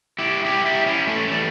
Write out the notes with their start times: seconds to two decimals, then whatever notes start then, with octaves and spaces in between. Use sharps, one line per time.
0.18 E4 G4
0.45 E4 G4
0.66 E4 G4
0.86 C#4 E4
1.07 A3 C#4
1.28 E3 G3 A3